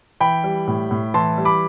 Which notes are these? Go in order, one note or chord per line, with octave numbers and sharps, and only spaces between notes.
E3 G5 B5
G3
A2
A2
E3 A5 C6
G3
B5 D6